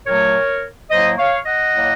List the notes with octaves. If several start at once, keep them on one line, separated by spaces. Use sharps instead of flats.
A#2 F#3 A3 A#4 C#5
A2 F#3 A#3 C5 D#5
C#5 F5
D#5 F#5
A2 F#3 A#3